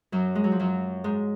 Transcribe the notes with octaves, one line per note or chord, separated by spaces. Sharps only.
F#2 F#3
G#3
F#3
F3
F#2 F#3
G#2 G#3